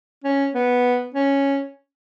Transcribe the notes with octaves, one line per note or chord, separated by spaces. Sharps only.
C#4
B3
C#4